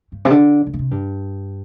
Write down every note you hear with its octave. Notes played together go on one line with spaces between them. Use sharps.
G2
C3
D3
D3
B2
C3
G2